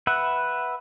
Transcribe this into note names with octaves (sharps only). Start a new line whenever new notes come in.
B4 E5 F#5